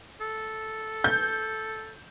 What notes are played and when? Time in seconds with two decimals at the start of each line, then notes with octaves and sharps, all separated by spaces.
0.21 A4
1.04 G6